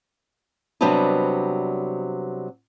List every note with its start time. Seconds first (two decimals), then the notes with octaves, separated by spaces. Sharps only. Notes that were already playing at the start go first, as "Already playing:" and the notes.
0.81 C3 F#3 G3 B3 C4 D4